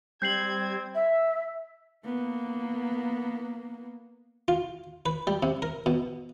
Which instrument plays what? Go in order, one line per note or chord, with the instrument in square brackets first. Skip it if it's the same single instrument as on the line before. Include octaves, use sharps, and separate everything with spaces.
[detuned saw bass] G3 [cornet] C4 [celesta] G6 C7 F#7 [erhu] G#6
[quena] E5
[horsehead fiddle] A#3 B3
[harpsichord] F4
B4
G3
C3
A#4
B2